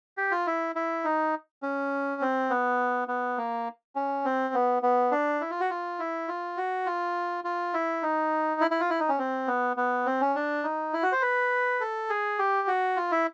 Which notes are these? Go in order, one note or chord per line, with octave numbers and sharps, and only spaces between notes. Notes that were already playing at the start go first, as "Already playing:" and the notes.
G4
F4
E4
E4
D#4
C#4
C4
B3
B3
A#3
C#4
C4
B3
B3
D4
E4
F4
F#4
F4
E4
F4
F#4
F4
F4
E4
D#4
E4
E4
F4
E4
D#4
C#4
C4
B3
B3
C4
C#4
D4
D#4
E4
F#4
C5
B4
A4
G#4
G4
F#4
F4
E4